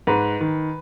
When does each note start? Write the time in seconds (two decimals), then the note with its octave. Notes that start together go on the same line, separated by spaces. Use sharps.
0.07 G#2 B4
0.41 D#3